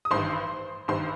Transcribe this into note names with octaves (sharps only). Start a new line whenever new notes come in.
D#6
A1 G2 D#3 C5 C6
A1 G2 D#3 C5 C6